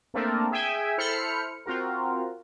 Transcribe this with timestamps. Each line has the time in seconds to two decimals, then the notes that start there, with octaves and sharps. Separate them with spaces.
0.14 A3 A#3 C4 D4 A4 A#4
0.51 G#4 E5 G5 G#5
0.98 E4 A4 C5 B5 F6 C#7
1.66 C4 F4 F#4 A#4